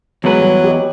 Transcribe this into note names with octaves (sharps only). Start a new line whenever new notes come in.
E2 F#3 G#3 B4
G3
G4 C#5 D#5